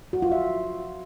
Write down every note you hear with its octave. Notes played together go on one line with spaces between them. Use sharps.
F#4
F4
E5